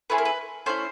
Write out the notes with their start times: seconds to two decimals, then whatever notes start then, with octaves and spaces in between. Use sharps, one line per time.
0.10 A3 C4 E4 G#4 B4
0.18 A#4
0.25 B4
0.66 A3 C#4 E4 C5